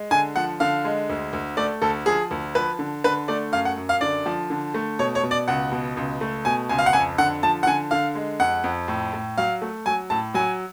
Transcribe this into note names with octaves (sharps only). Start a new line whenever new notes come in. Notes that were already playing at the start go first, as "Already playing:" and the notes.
Already playing: G#3
D3 G#5
F3 F#5
D3 F5
G#3
D2
D2
A3 D5
D2 A4
F3 G#4
D2
F3 B4
D3
D3 B4
A3 D5
F#2 F5
F#5
F#2
F5
D3 D5
F3
D3
A3
B2 C#5
C#5
B2
D5
C#2 F#5
B2
C#2
A3
B2 G#5
C#2 G#5
F5
F#5
F2 G#5
D3 F#5
F3 A5
F#5
D3 G#5
D3 F5
G#3
F2 F#5
F2
A2
A2
F#3 F5
A3
F#3 G#5
A2 A5
F#3 G#5